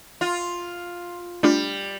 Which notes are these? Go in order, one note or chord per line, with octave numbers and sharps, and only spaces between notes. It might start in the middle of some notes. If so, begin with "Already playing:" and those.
F4
G3 A3 D4 F4